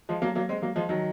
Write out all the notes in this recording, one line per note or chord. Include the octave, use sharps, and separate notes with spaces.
F3 G#3
F#3 A#3
F#3 A#3
G#3 C4
F#3 A#3
F3 G#3
D#3 F#3